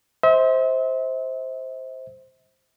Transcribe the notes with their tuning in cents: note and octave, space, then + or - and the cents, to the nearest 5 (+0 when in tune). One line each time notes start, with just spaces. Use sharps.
C5 +0 E5 -40